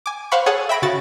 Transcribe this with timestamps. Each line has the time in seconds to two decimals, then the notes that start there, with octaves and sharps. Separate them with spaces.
0.06 G#5 D6
0.31 C5 F5 F#5 B5 C#6
0.46 G#4 A4 C#5 F#5
0.69 E5 G5 B5 A#6 D7
0.82 C#3 F#4 A6